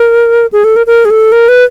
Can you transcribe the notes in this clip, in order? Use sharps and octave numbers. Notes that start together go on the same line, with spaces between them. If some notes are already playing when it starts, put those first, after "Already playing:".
Already playing: A#4
G#4
A4
A#4
A#4
G#4
A4
A#4
B4